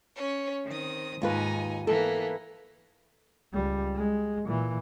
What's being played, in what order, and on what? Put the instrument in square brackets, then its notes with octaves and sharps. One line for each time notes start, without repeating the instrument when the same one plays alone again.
[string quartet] C#4 C#5
D#3 C4 D#6
[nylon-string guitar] D#2 F4 B4 [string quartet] G#2 D#4 G#5
[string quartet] E3 A#3 B3 [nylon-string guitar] A4
[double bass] C#2 G3
G#3
A#2 E3